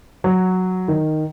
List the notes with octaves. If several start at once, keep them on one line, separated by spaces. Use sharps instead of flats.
F#3
D#3